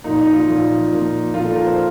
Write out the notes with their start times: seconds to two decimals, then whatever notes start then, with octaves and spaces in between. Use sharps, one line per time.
0.04 A#2 F3 A#3 D#4
0.19 D#4
0.33 F4
0.48 A#2 F3 A#3
0.91 A#2 F3 A#3
1.34 A#2 F3 A#3 F4
1.45 A4
1.56 A#4
1.66 C5